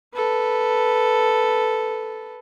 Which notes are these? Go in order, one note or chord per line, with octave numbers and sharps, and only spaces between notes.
A4 B4